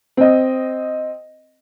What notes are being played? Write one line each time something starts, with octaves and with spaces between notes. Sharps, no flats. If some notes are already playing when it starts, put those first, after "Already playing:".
C4 D#5